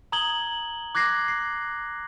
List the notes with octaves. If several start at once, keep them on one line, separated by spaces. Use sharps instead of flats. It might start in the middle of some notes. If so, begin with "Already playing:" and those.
A#5 D#6 G#6 F#7 G7
D6 F#6 G#6 A#6 C7
C7